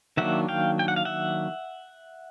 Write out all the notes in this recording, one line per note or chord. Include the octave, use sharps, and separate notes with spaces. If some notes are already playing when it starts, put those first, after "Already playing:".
D#3 F#3 A#3 D4 E5 F#5
F5 G5
G5
F#5
F5
E5 F#5